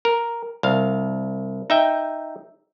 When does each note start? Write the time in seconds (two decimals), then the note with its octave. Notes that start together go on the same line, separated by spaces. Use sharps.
0.05 A#4
0.63 C2 F5
1.70 D#4 E5 G5